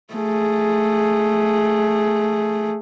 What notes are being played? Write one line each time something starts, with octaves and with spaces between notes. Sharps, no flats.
A3 G#4